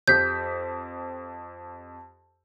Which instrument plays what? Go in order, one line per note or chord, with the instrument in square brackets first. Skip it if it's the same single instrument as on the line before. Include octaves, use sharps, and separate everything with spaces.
[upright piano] F2 G4 B6 [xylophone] G6